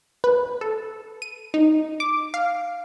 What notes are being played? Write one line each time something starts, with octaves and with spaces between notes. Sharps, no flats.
B4
A4
D#7
D#4
D6
F5